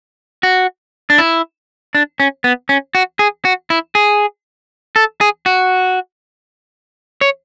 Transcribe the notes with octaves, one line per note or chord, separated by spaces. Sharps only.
F#4
D4
E4
D4
C#4
B3
C#4
F#4
G#4
F#4
E4
G#4
A4
G#4
F#4
C#5